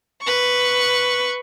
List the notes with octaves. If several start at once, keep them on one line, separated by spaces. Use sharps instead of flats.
B4 C#6